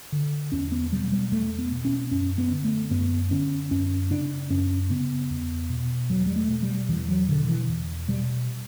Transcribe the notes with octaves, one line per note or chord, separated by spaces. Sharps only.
D3
E2 C#4
B3
B2 G3
G3
E2 A3
B3
B2
C#4
F#2 C#4
B3
D3
A3
F#2 B3
D3 C#4
F#2 C#4
C#3 D4
F#2 C#4
C#3 B3
E2
B2
E2 F#3
G3
A3
B2
G3
E2 E3
F#3
B2 D3
E3
E2
B2 G3